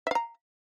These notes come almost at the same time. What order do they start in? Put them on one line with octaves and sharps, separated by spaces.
E5 F5 A#5